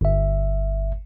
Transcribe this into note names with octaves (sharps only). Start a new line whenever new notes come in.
G1 E5